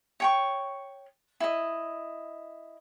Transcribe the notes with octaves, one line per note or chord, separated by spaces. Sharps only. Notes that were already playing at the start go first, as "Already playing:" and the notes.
C#5 G5 C#6
E4 D#5